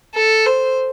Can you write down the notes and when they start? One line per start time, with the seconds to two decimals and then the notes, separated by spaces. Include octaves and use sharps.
0.15 A4
0.46 C5